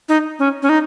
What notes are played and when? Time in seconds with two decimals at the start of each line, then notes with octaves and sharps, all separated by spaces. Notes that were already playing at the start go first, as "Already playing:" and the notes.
0.09 D#4
0.39 C#4
0.62 C#4
0.69 D#4